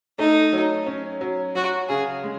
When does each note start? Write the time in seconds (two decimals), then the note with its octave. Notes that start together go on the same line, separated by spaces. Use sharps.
0.19 A3 D#4
0.53 F#3
0.86 C#4
1.21 F#3
1.55 F#3 F#4
1.89 C#3 G#4
2.24 G#3